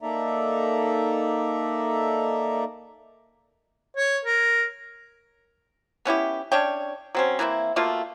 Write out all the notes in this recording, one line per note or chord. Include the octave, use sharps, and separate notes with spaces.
A#3 D#4 A4 D5 E5 A#5
C#5
A#4
B3 C#4 E4 G4
C#4 D4 C#5 G5
F#3 C4 C#4
E3 A#3 C4 E4
B2 A3 A#3 F4